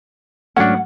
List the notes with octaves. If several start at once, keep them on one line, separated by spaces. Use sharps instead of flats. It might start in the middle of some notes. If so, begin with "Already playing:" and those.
G#2 F#3 A3 C#4 D4 F#5